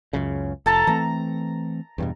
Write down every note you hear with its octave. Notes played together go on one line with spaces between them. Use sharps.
C#2 F#2 C#3
F1 A4 A5 A#5
E3 A3 C4 A#5
E2 G2 B2